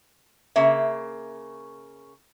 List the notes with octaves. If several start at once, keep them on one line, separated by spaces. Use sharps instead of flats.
C#3 A#3 E5